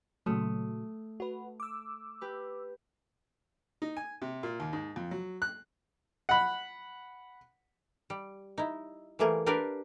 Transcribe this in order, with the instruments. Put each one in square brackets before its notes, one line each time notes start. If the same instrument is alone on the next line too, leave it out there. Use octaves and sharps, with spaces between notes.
[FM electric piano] A#2 C#3 F#3 [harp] A3 D#6
[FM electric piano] F#4 B4
D6 E6
[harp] G4 B4
[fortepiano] D#4
G#5
C3
A#2
D#2
G#2
F2
F#3
F#6
F#5 B5
[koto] G3
D#4 E4
E3 G3 A3 A#3 G#4
D4 G4 A#4 B4 D5 F5